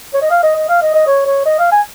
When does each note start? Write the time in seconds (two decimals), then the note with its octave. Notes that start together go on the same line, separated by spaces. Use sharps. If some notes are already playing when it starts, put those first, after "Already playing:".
0.14 C#5
0.22 D#5
0.31 F5
0.43 D#5
0.56 D#5
0.69 F5
0.82 D#5
0.94 D#5
1.07 C#5
1.26 C#5
1.45 D#5
1.59 F5
1.72 G#5